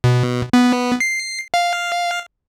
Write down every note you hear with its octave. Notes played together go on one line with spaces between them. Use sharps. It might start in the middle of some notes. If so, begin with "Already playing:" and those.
B2
B3
C7
F5